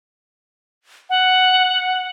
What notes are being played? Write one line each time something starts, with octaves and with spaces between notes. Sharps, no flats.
F#5